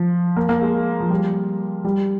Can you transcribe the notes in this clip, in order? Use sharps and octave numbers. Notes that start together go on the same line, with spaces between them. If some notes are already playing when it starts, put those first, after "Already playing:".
Already playing: F3
A#3
A#3
G#3
F3
G3
G3